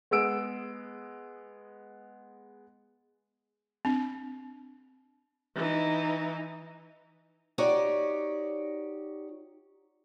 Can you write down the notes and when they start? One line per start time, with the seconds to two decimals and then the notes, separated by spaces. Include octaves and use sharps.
0.11 G#3 B3 G#4 E6 D7
3.85 C4 D4
5.55 E3 D#4
7.58 D#4 F#4 G4 C#5 D5